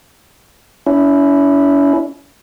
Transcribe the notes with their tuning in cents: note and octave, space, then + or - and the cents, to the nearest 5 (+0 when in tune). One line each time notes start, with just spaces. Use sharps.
C#4 +40 E4 +0